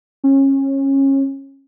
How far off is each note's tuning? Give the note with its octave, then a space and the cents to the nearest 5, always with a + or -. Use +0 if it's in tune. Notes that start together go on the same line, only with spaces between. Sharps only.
C#4 -25